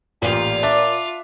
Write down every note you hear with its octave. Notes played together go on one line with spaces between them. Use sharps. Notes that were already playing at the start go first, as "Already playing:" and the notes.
A1 A#2 F4 G4
D4 E5